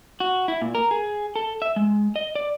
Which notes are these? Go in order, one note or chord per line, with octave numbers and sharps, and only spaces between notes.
F#4
E4
A#2
A#4
G#4
A4
E5
G#3
D#5
D5